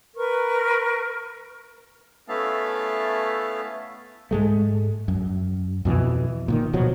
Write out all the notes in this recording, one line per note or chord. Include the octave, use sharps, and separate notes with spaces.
A#4 B4 C#6
A3 B3 C#4 E4 F5 A5
G#2 G#3 A3
F#2
F2 B2 E3
A#2 D3 D#3
D1 B2 F3 F#3